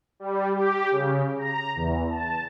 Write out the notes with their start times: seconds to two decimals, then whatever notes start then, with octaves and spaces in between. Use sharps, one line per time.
0.20 G3
0.53 G4
0.91 C#3
1.38 A#5
1.76 E2
2.09 A5